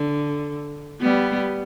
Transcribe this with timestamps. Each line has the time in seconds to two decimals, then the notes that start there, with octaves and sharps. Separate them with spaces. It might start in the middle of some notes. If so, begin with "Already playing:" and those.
Already playing: D3
1.01 G3 B3